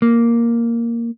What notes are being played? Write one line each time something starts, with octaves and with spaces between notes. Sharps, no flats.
A#3